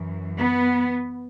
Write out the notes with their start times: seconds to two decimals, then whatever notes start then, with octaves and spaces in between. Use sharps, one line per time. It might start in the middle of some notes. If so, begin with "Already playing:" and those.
Already playing: F#2 E3
0.37 B3